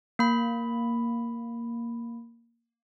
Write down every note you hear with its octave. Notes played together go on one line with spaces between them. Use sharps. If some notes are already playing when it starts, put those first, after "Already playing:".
A#3 B5